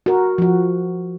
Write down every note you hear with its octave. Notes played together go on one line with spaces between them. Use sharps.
F#4 A#4
F3 F#4